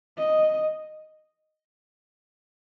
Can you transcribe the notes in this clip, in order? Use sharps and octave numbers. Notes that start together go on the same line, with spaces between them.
D#5